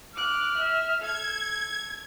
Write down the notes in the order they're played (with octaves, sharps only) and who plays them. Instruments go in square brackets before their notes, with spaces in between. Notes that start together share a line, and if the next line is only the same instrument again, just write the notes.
[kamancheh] D6 F#6 [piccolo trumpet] F6
[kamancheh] E5
[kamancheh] A4 [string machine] G#6